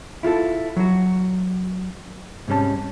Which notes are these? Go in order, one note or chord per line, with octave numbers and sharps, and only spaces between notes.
E4 F4 G4 A4
F#3 F#4
G#2 C3 G3 C#4 A5